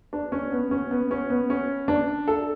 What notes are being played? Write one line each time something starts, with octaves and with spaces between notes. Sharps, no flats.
D4
C#4
B3
C#4
B3
C#4
B3
C#4
D4
A4